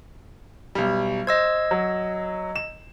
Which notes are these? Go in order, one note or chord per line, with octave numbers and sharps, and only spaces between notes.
B1 G3
C5 D#5 E6 G#6
F#3
E7